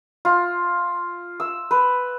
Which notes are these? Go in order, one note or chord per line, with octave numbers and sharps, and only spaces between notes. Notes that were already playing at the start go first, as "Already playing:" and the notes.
F4
E6
B4